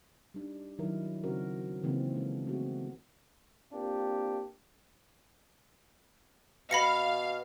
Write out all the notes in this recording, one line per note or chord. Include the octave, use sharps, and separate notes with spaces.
G3 D4 D#4
D#3 F#3 D#4 E4 A#4 E5
C#3 C4 C#4 F#4 A#4 C5
C#3 E3 G#3 A#3 C4 D#4
G#3 C#4 A4
A3 B3 C4 F#4 G#4
A#3 C4 D4 F4 G4
B2 F5 B5 A#6 C#7